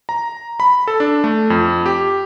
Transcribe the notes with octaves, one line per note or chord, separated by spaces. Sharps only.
A#5
B5
A4
D4
A3
F2
G4